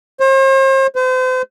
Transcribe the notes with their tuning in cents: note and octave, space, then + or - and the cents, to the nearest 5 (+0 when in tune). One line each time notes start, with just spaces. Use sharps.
C5 +40
C5 -40